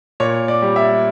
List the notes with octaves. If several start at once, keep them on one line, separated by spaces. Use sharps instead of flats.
A#2 C#5
D5
G3
E5